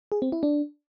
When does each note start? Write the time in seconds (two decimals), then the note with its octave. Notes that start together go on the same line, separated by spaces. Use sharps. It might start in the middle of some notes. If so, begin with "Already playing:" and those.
0.12 G#4
0.22 C4
0.32 E4
0.43 D4